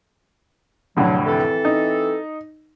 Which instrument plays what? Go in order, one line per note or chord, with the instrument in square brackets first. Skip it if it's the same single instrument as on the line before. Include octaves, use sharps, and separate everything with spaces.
[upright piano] F1 A2 D3 [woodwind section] F#3
[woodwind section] E3 C4 A4
[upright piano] D#4